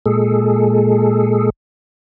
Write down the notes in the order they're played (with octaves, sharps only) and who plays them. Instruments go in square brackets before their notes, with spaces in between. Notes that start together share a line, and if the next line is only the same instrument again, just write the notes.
[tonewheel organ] A#2 G#3 G#4 A4